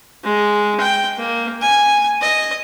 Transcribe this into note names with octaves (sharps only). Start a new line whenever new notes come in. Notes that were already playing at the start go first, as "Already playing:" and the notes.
G#3
G5
A#3
G#5
D#5